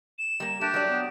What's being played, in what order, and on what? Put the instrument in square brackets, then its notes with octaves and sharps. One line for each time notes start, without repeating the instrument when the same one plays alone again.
[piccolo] E7
[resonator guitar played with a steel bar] G3 A#3
[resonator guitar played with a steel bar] A3 [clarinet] D4 [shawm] G4
[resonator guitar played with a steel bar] F#3 D5
[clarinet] B3